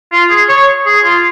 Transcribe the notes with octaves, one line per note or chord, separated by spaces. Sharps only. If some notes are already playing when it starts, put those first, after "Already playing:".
F4
G#4
C#5
G#4
F4